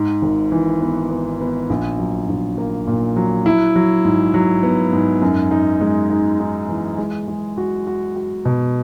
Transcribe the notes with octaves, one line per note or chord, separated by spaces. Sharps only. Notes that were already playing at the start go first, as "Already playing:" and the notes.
Already playing: G#2
G#1
E3
B3
B3
B3
A#1
F#3
A#1
A#3
A#2
F#3
E4
F#3
G#2
F#3
B3
G#2
F#2
D#4
G#3
D#4
D#4
E3
G#3
G#3
F#4
F#4
F#4
B2